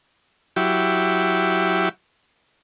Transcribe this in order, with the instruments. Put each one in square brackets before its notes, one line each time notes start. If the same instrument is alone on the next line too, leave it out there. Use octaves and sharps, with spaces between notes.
[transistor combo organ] F#3 E4 G4